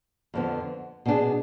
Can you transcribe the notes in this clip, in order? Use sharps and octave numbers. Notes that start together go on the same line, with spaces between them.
F2 D3 F3 B3
B2 B3 D4 G#4